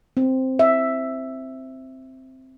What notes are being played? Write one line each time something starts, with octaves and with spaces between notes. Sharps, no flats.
C4
E5